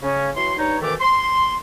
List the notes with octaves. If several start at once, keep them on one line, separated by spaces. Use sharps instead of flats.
C#3 C#4
E3 F#3 C#5 C6
G2 D#4 C#5
D2 B2 D#3 E3 A3 D6
C6